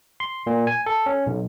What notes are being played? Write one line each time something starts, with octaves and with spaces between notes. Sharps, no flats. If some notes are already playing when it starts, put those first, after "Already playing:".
C6
A#2
G#5
A4
C#4
B1